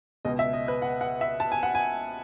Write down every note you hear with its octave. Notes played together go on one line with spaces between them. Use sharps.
C#2 B2 D#5
E5
D#5
B4
F#5
F#5
E5
A5
G#5
F#5
G#5